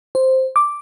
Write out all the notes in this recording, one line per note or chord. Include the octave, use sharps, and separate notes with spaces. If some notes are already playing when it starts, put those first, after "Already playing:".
C5
D6